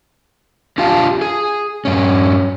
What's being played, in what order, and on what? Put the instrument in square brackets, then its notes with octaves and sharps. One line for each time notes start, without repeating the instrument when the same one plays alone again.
[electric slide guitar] D4 F4 G4 F5 A5
G#4
G2 C#4